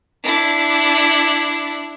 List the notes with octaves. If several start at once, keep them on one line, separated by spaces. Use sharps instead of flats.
D4 E4